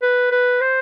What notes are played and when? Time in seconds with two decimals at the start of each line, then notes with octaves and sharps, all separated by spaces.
0.02 B4
0.31 B4
0.61 C5